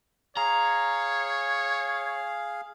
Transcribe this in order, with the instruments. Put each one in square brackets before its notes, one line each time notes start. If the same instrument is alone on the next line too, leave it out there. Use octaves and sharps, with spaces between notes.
[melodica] G#4 F5 [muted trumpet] C#5 [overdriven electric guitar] A#5